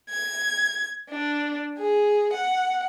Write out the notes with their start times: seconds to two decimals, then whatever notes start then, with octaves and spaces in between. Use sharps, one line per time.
0.10 G#6
1.10 D4
1.78 G#4
2.34 F#5